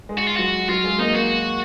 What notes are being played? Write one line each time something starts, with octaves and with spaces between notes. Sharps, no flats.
G#3
F#4
F4
F#3 F#4
F#3 F4
G#3
A#3 D#4
A#3 F#4